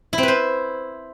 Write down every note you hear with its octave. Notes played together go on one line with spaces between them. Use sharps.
E4
C4
B4
C5